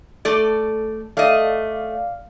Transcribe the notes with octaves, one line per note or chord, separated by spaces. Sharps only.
A3 A4 D5
A3 D5 D#5 F5